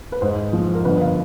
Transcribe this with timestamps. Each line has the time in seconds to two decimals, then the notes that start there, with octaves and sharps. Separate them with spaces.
0.12 B4
0.21 G#2 C5
0.53 F3
0.75 A#4
0.85 G1 B4
1.01 F5